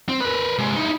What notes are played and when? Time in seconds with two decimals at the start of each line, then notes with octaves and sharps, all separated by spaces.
0.09 C4
0.21 A#4 B4
0.58 C3 G#3
0.77 D#4 E4